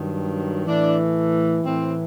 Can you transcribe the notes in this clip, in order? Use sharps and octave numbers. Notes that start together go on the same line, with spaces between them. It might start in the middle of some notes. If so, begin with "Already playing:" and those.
Already playing: G2 D#3 F#3
A2 E3 D4
A2 E3 C4